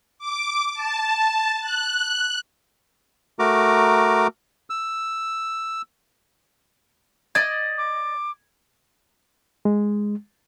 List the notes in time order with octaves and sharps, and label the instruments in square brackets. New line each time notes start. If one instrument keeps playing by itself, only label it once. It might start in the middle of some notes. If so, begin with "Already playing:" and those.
[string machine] D6
A5
F#6
[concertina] A3 F#4 A#4 A#5 D6
E6
[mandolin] D5 D#5 [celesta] G#6
[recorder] D6
[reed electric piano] G#3